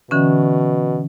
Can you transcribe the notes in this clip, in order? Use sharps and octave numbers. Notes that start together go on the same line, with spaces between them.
B2 D3 E3 C#4